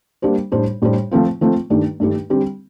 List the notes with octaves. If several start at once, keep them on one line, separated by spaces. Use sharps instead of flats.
G3 A#3 D4 G4 C5
A2 G3 D4 G4 C5
A2 G3 D4 G4 C5
F3 A3 C4 F4
F3 A3 C4 F4
G2 D#3 A3 D4 G4
G2 D#3 A3 D4 G4
D3 G3 C4 G4